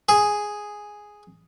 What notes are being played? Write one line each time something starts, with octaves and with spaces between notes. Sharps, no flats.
G#4